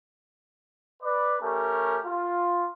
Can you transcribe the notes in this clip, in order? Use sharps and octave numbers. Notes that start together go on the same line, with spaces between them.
B4 D5
A3 C#4 G4 A#4
F4